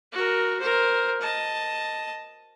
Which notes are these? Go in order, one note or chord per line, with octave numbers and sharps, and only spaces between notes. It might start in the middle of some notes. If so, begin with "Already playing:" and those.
F#4 A#4
A#4 C5
D#5 A5